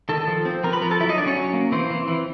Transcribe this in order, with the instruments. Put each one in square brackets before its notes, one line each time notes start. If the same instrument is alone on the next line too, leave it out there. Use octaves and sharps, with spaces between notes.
[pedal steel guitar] D#3 A4 A5
F3
C4
F3 A#4 A#5
B4 B5
F3 A#4 A#5
A4 A5
F#3 E4 E5
D#4 D#5
F#3 D4 D5
C#4 C#5
F#3
A#3
E3 C4 C5
E3
E3